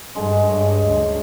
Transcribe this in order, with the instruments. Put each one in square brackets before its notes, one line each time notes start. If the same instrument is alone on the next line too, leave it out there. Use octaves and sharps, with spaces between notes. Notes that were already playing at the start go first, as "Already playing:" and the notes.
[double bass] G2 [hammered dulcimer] D3 G#3
[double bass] G2 [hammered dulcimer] C#5 D#5 G#5
[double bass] D2